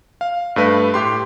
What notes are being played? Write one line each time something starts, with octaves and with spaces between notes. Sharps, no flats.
F5
G2 A3 B4
A2 G4 C6